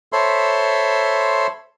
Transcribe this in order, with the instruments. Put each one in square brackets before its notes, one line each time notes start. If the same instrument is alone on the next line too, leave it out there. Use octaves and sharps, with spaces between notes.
[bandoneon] A4 C5 C#5 E5 B5 C6